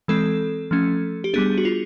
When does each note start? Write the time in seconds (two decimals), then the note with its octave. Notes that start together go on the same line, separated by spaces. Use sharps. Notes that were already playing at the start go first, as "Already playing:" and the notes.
0.08 E3 G#3 C4 A4
0.71 F3 A3 C#4
1.24 G4
1.34 G3 B3 D4 G#4
1.58 F#4
1.65 F4